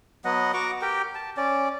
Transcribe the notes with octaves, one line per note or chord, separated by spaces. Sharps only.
F#3 B3 D#5 F#5
F#4 A#5 C#6 D6
G4 A#4 G5
A5
C#4 D5